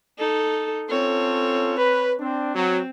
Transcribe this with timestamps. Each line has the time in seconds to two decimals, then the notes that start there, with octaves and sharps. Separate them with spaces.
0.18 D#4 A4
0.89 C4 C#4 F4 A4 C#5
1.78 B4
2.19 C4 D4
2.55 F#3 C4